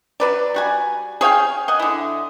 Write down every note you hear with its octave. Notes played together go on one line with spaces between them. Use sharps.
F#3 B4 D5
G3 F#4 G#5
G#4 C#5 F5 G5
D#5 F#5 G#5
D3 E4